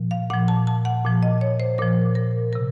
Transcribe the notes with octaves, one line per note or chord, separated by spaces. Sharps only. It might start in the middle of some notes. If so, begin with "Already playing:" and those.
Already playing: A#2 F3
F5
A#2 F3 F#5
A5
A5
F#5
A#2 F3
D#5
C#5
C5
A#2 F3 A#4
A#4
C3 A#4